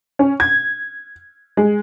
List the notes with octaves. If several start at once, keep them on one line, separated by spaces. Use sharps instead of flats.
C#4
G#6
G#3